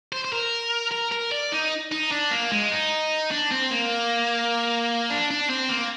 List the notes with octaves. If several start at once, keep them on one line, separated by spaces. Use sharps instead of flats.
C5
C5
A#4
A#4
A#4
D5
D#4
D#4
D4
A#3
G#3
D#4
D4
C4
A#3
D4
D4
C4
A#3